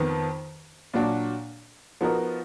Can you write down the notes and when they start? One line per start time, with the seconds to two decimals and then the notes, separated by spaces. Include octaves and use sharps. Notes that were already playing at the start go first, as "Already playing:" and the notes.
Already playing: F2 D#3 B3
0.94 A#2 F#3 D4 F#4
2.01 F3 B3 D#4 F#4 A#4